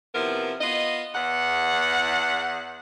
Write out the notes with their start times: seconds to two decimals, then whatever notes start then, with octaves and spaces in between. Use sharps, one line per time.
0.15 C3 F3 B3 E4 A#4
0.61 B3 F4 D#5
1.15 E2 F#5